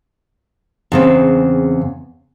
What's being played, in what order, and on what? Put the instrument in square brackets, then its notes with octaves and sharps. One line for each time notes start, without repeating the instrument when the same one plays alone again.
[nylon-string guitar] E2 C#3 C4